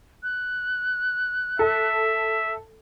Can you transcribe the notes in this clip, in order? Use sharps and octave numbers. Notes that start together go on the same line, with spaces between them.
F#6
A4 E5